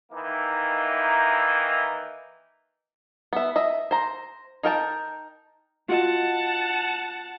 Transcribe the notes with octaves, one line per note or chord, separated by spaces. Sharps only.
D#3 E3 A#3 D#4 E4
B3 E5
D#5 E5
C5 A#5
D#4 A#4 G5 A5
F4 F#4 D#5 F#5 A5